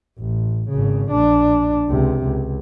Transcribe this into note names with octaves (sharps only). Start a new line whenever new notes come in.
A1
G#1 C#3
A#1 D4
C#2 C3
C#2